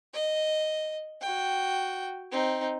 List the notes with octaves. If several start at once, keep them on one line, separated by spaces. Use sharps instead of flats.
D#5
F#4 G5
C4 D#4